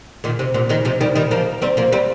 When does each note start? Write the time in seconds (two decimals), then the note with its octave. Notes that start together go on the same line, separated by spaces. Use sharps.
0.24 A#2 D#3
0.39 C3
0.54 A#2
0.69 A#2 D#3
0.85 C3 F3
1.01 D#3 G3
1.15 D#3 G3
1.31 F3 A#3
1.62 G3 C4
1.77 F3 A#3
1.92 G3 C4